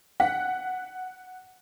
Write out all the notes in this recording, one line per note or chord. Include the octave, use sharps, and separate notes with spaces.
F#5 F#6 B6